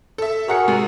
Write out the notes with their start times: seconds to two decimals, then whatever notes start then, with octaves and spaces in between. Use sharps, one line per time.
0.18 A4 E5
0.48 F#4 G#4 A#4 C#5 F#5 C#7
0.68 G#2 C3